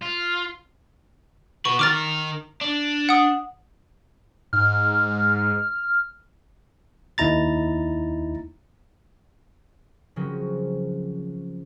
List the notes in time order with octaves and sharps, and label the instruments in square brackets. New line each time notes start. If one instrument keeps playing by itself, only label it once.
[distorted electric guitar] F4
[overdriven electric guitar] F#4 B4 [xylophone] C#6
[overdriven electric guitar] D#3 A#4 [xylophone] D6 F6 A6
[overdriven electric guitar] D4
[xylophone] F#5 D#6
[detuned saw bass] G#2 [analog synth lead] F6
[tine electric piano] D#2 D#4 E4 A#5 A6
[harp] C#3 F3 F#3 A#3 C4 C#4